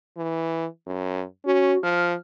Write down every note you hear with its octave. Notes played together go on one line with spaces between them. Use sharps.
E3
F#2
C#4 F#4
F3 F6